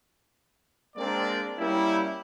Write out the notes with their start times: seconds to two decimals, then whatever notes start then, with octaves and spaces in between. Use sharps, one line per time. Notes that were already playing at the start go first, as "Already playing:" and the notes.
0.96 G#3 A#3 C4 D4 A#4 D5
1.58 G3 A#3 C#4 E4